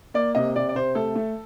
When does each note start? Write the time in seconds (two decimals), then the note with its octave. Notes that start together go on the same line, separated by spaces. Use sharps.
0.14 A#3 D5
0.35 C3 D#5
0.56 C3 D5
0.69 D5
0.75 C3 C5
0.95 A3 A4
1.16 A3